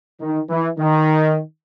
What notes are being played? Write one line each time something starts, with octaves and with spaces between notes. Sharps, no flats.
D#3
E3
D#3